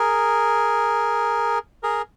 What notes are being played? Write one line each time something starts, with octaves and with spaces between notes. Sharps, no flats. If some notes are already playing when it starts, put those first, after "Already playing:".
Already playing: G#4 A#4
G#4 A#4